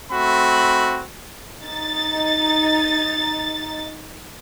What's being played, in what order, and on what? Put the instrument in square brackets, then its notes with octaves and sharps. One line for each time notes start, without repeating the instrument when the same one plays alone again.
[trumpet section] A3 C4 F#4 B5
[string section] D#4 A6